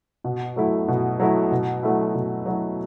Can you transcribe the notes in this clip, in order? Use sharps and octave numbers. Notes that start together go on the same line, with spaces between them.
B2
F#3 A3 E4
B2
F#3 A3 E4
B2
F#3 A3 E4
B2
F#3 A3 E4